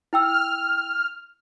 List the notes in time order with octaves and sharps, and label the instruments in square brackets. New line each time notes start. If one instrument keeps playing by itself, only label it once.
[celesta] E4 G5 E6 [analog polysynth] F6